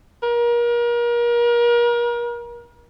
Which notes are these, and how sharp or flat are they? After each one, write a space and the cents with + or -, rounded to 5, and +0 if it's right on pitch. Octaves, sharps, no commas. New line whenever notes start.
A#4 +35